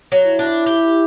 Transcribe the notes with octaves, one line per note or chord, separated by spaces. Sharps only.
F#3
E4
D4
G4